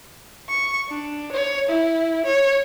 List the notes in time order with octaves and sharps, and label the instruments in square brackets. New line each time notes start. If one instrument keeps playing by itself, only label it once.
[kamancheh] C#6
D4
C#5
E4
C#5